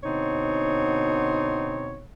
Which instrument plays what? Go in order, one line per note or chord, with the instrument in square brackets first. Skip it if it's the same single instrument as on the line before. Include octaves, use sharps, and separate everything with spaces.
[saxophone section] B2 D3 C4 D#4 C#5